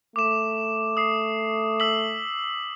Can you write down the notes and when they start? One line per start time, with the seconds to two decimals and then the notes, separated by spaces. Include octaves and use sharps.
0.16 A3 D6 E7
0.97 D#6 C7
1.80 E6 B6 F#7